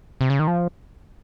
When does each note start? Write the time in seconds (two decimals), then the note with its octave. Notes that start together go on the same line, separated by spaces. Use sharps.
0.21 C3
0.30 C#3
0.39 D#3
0.47 F3